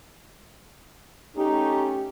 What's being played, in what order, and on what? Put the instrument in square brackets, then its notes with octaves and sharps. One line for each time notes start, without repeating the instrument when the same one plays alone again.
[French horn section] A3 C#4 G4 [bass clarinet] D#4